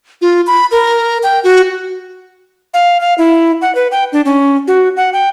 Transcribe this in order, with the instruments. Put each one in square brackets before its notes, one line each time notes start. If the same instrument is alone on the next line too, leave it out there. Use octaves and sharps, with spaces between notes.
[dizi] F4
B5
A#4
G5
F#4
[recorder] F5
F5
E4
F#5
B4
G5
D4
C#4
F#4
F#5
G5